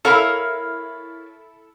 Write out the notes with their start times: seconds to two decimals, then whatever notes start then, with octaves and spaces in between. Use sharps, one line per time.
0.05 E4 A4 A#4 C#5 F5 B5 F6